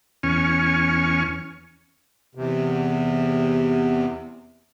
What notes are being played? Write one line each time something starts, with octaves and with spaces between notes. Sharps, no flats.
E2 C#4 G#5 C#6 F6
E2 C3